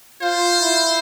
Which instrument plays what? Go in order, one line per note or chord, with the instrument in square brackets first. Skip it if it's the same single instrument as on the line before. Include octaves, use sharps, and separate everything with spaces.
[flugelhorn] F4 [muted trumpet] C5
[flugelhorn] E4